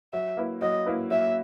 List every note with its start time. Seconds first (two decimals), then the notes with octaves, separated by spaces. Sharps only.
0.13 F#3 E5
0.37 A#3 E4 B4
0.62 F#3 D#5
0.86 A#3 E4 B4
1.11 F#3 E5